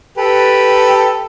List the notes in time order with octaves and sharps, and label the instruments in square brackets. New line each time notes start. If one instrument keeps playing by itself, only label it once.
[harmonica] G4 A4 B4